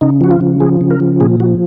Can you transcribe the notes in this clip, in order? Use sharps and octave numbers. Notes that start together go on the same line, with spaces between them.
C#3 D#4
F3 F#4
F4
C#3
F3 G#4
C#3
A#4
F3
A#2 G#4
F3 F#4